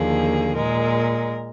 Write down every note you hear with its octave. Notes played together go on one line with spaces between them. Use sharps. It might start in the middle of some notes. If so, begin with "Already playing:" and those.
Already playing: D#2 D3 F3 A#3 G#4
A#2 G#3 A#4